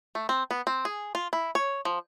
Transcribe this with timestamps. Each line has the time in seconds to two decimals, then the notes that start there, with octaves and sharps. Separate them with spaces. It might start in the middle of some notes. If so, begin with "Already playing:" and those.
0.15 A3
0.29 C4
0.51 B3
0.67 C4
0.85 G#4
1.15 F4
1.33 E4
1.55 C#5
1.85 F3